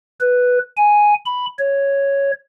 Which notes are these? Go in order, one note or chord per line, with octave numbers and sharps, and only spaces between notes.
B4
G#5
B5
C#5